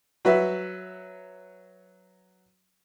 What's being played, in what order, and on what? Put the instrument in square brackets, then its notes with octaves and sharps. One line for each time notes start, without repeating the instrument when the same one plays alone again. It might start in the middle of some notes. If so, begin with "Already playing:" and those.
[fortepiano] F#3 F#4 B4 E5